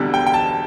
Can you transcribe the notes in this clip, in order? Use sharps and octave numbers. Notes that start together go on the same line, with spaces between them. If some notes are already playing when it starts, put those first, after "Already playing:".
Already playing: E1 E2 D3 G3
G5
G5
A5